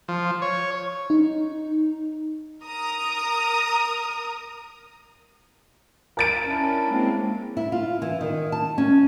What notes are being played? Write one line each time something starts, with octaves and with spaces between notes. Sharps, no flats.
F3
C#5
D#4
A#4 A#5 D#6
A#4 A6 D7
C#4 D4 E4
G#3 A#3 C4
E4
F4
E3
D#3
A5
C#4